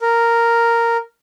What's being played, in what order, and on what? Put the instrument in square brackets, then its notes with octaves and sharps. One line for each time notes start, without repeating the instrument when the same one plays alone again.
[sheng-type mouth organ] A#4